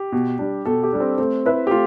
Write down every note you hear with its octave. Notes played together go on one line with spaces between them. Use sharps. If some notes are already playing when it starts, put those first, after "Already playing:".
Already playing: G4
B2
G3 D4
B2 A4
G4
G3 D4
C4
A3 C4
E4 B4 E5
G4
A3 F4